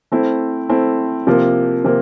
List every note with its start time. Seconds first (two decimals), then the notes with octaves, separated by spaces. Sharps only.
0.12 A3 C4 E4
0.69 A3 C4 E4
1.27 C3 F3 A#3
1.84 C3 F3 A#3